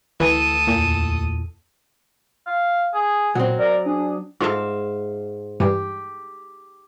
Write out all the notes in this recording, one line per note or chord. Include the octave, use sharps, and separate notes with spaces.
D2 E3 A4 D#6
E2 A#2
F5
G#4
A#2 F#3 C4
A#4 D5
D4 G#4
G#2 F4 G#4 A4 E5 F5
G2 E3 G3 G4